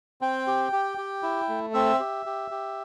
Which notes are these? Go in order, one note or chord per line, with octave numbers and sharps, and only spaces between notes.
C4 G5
G4
G4
G4
E4
A3
C4 E5
G4
G4
G4